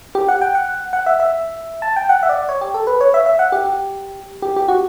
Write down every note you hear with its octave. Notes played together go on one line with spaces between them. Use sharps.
G4
F#5
G5
F#5
F#5
E5
E5
A5
G5
F#5
E5
D5
C#5
G4
A4
B4
C#5
E5
E5
F#5
G4
G4
G4
G4
F#4